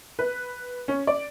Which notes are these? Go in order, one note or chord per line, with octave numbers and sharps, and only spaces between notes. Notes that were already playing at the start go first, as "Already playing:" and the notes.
B4
C#4
D5